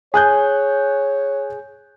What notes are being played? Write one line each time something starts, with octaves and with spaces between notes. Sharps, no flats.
G#4 C#5 G#5 F#6 G6